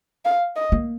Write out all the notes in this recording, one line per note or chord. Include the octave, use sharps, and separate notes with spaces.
F5
D#5
A#3